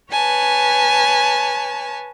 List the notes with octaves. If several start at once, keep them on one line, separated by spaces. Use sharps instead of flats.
B4 C#5 G#5 A5